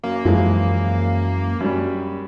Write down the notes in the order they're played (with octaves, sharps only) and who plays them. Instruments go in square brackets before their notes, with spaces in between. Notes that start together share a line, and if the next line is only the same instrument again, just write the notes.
[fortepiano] F#2 [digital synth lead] A#3
[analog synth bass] F#2 [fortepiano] E3 F3 G#3
[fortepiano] F#2 G3